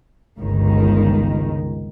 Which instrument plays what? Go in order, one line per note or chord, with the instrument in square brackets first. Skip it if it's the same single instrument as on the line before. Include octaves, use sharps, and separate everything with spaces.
[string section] G1 C#2 D#3